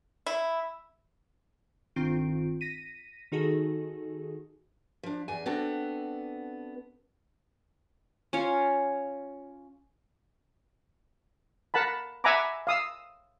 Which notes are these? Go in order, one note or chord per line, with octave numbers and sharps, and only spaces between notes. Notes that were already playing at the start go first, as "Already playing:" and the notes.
E4
G1 D#3 C4 F4 D7
A#6 B6 D#7
D#3 D#4 F#4 G#4 A4
F3 D4
E2 G#5
B3 C4 D4 F#4 A4
C#4 F4 C#5
A#4 F#5 A5 B5
E5 F#5 G#5 A#5 B5 D6
F5 D#6 E6